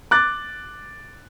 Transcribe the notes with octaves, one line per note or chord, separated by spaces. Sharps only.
D6 F#6 A6